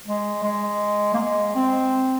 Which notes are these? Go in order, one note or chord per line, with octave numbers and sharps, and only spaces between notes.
G#3
G#3
A#3
G#3
C4